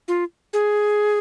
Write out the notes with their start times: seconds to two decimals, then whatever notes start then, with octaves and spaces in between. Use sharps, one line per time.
0.08 F4
0.53 G#4